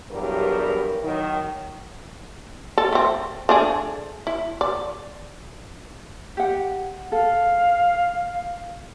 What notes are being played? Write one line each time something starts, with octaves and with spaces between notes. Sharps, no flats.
E2 G2 F#3 G3 A#4
D#3 F#3
A4
A3 C4
A3 D4 G#4
E4
D5
G4 F#5
A4 F5